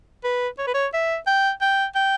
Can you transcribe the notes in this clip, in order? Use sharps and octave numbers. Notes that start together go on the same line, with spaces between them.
B4
C#5
B4
C#5
E5
G5
G5
G5